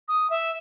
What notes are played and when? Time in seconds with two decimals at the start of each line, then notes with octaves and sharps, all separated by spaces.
0.08 D#6
0.30 E5